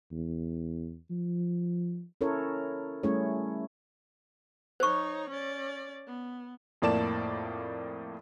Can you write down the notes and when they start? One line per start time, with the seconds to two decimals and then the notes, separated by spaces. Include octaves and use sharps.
0.12 E2
1.10 F3
2.21 C#4 E4 A4 A#4 C#5
3.03 G3 A3 C#4 E4 G#4 C#5
4.80 D#4 C5 C#5 C#6
5.30 C#4 D5
6.07 B3
6.82 F2 A2 A#3 D5 A5 E7